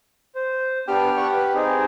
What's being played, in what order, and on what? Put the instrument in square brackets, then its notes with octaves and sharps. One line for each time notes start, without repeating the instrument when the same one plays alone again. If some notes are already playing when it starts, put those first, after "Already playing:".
[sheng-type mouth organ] C5
[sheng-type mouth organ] B3 D4 F6 [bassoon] G4
[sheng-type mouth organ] F#5 C#6
B4
C4 D#4 G#4